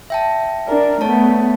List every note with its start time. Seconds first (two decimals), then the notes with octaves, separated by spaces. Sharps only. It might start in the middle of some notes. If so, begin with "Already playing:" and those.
0.10 E5 G5 A5
0.67 D4 A#4
1.01 A3 B3 C#5 A5